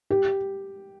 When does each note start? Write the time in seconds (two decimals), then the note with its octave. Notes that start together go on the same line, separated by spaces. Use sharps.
0.10 G4